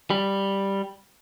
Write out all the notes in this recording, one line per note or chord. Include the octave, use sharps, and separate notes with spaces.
G3